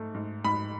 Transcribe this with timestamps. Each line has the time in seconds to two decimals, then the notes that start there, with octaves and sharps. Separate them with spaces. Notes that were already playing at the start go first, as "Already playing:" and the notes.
Already playing: G#2 A3
0.14 G#2
0.44 G#2 B5